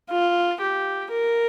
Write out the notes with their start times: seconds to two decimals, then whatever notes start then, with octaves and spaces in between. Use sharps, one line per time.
0.10 F4
0.61 G4
1.11 A#4